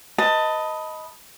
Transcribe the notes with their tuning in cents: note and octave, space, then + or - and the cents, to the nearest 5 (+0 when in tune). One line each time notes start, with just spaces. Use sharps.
B4 +0 D#5 +15 A5 +20